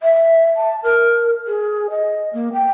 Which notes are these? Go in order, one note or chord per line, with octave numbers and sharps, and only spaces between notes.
E5
A5
A#4
G#4
D#5
A#3
G5